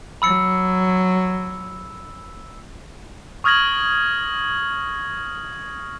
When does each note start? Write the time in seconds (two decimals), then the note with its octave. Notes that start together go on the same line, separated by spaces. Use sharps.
0.22 F#3 B5 E6 C#7
3.44 C#6 D#6 F6 G#6 A#6 F#7